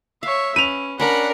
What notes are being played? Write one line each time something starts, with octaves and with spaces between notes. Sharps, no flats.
C#5 E5 F5
C#4 B4 D#7 F7
C#4 D4 A#4 F#5 A#5 B5